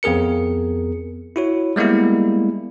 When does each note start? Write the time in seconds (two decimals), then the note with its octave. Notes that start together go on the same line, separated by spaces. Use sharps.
0.03 F2 B3 G#4 A#4 C#7
1.36 E4 F#4 C#5
1.76 G3 G#3 A#3 B3 E4